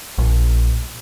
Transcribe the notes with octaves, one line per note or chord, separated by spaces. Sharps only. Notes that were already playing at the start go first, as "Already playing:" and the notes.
A#1